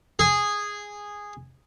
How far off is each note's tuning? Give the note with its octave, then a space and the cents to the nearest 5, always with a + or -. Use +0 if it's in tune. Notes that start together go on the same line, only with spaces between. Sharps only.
G#4 -10